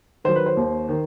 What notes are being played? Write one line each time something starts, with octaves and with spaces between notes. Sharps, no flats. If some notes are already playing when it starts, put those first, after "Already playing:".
D#3 F#3 C5
B4
C5
D#2
D#3